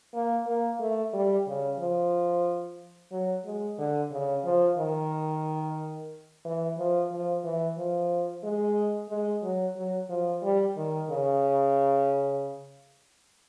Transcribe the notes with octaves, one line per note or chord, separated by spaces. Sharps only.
A#3
A#3
A3
G3
C#3
F3
F#3
G#3
D3
C#3
F3
D#3
E3
F3
F3
E3
F3
G#3
G#3
F#3
F#3
F3
G3
D#3
C#3